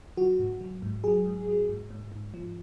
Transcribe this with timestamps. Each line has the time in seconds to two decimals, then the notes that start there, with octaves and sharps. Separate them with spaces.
0.17 F#3 F#4
0.39 G#2
0.61 F#3
0.82 G#2
1.04 F#3 G#4
1.26 G#2
1.48 F#3
1.69 G#2
1.91 G#2
2.12 G#2
2.34 F3